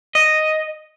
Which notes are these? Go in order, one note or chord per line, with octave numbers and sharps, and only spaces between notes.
D#5